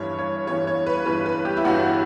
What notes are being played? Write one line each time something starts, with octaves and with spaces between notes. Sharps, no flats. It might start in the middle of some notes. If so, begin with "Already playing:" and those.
Already playing: G1 G2 E3 C#5
C#5
G1 G2 E3 C#5
C#5
B4
G1 G2 E3 B4
B4
G4
E4
G1 G2 E3 F#4